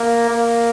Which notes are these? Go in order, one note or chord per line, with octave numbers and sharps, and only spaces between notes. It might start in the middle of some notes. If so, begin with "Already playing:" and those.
Already playing: A#3
A#3